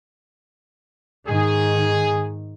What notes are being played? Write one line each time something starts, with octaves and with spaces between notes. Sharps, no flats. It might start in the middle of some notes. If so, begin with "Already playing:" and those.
G#2 D#3 G#4